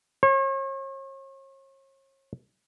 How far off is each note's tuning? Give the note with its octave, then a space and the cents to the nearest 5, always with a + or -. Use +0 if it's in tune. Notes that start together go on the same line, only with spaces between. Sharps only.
C#5 -40